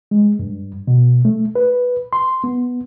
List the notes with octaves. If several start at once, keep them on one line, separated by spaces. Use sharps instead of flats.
G#3
G2
B2
A3
B4
C6
B3